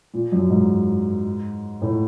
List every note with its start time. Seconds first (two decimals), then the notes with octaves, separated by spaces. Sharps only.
0.14 A#2
0.32 F#2
0.50 G#2
1.82 A2